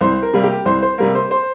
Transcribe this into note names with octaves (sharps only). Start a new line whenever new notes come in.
C2 C5
A#4
C3 G3 A#3
G4
C2 C5
C5
C3 G3 A#3 A#4
C5
C5